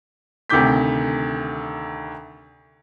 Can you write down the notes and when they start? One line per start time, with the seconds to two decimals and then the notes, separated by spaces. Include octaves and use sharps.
0.50 D2 C3 D#3 D6 G6 B6